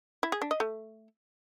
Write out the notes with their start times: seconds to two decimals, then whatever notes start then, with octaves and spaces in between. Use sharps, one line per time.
0.23 E4
0.32 G#4
0.42 D4
0.51 D#5
0.60 A3